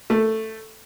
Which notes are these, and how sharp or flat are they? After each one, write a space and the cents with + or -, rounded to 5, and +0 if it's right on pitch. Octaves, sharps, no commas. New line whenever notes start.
A3 +5